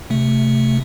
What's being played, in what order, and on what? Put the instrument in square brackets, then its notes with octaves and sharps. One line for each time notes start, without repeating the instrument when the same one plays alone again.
[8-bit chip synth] C3 A3